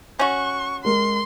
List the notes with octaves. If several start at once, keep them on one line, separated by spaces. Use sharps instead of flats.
C#4 F#4 C#6
G#3 A#4 C6